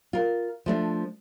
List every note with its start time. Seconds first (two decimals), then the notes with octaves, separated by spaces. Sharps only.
0.13 F4 A#4
0.66 F3 A3 D4